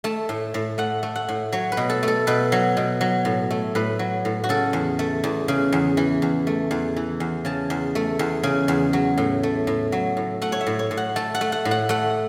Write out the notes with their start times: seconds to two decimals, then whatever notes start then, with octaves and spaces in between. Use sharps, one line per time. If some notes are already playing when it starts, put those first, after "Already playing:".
0.04 A3 A5
0.29 A2
0.54 A2
0.78 A3 F#5
1.03 A3
1.16 F#5
1.29 A2
1.52 F#3 C#5
1.72 B4
1.77 B2
1.89 A4
2.03 A3 A4
2.27 B2 B4
2.52 F#3
2.77 B2
3.01 F#3
3.25 A2
3.50 A3
3.75 A2 B4
3.99 F#3
4.25 A2
4.44 F#4
4.49 C#3 A4
4.73 E2
4.99 A3
5.24 E2
5.48 C#3
5.73 E2
5.97 E3
6.22 E2
6.47 A3
6.71 E2
6.96 E3
7.20 E2
7.45 C#3 A5
7.70 E2
7.95 A3
8.19 E2
8.43 C#3
8.68 E2
8.93 F#3
9.18 A2
9.43 A3
9.67 A2
9.92 F#3
10.17 A2
10.42 A3 F#5
10.52 C#5
10.61 E5
10.67 A2
10.79 C#5
10.91 A2
10.97 F#5
11.16 A3 A5
11.35 F#5
11.41 A3
11.52 F#5
11.65 A2
11.71 F#5
11.89 A3 F#5